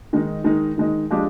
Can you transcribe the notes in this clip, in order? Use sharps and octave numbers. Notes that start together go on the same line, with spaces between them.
D#3 G#3 D#4
D#3 G#3 D#4
D#3 G#3 D#4
F3 G#3 D4 G4